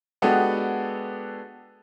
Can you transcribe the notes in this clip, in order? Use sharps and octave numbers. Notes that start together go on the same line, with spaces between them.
G#3 B3 D4 F#4 G4 A4